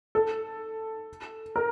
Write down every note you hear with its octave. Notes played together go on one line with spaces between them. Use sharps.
A4
A#4